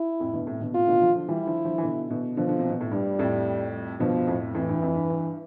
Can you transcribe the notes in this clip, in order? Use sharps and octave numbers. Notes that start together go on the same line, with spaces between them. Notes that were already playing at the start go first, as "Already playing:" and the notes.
Already playing: E4
F2 A2
G2 B2
A2 C3
B2 D3
A2 C3 F4
B2 D3
D3 F3
D3 F3
E3 G3 E4
D3 F3
D3 F3
E3
B2 D3
B2 D3
B2 D3 F3
D3
C3
B2
A2
G2 G3
F2 A2
G2 B2 F3
F2 A2
F2 A2 E3
G2
F2
G2
G2